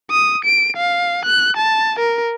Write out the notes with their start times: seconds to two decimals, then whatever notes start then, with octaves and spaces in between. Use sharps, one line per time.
0.11 D#6
0.45 D7
0.77 F5
1.25 F#6
1.57 A5
2.00 A#4